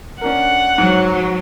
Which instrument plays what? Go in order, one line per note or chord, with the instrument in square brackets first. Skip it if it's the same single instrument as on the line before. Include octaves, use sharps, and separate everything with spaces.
[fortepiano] C#4 D4 A#4 [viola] F#5
[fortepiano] G#2 [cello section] F#3